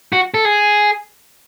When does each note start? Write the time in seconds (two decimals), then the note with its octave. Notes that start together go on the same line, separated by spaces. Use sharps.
0.13 F#4
0.34 A4
0.45 G#4